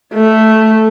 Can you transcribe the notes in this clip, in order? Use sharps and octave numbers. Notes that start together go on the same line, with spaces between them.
A3